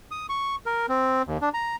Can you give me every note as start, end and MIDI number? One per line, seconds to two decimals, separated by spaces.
0.11 0.26 87
0.29 0.56 85
0.66 0.86 70
0.89 1.22 60
1.27 1.38 39
1.42 1.49 62
1.54 1.76 82